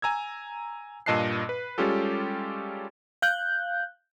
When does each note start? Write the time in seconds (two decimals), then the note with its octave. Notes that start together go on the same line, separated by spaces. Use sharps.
0.02 G#5 A#5 E6 G#6
1.06 G2 A#2 D#5 A5 F#6 C7
1.49 B4
1.78 G3 G#3 C#4 F4 G4 A4
3.22 F5 F#6 G6